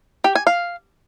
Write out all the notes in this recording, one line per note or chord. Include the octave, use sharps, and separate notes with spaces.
G4
G#5
F5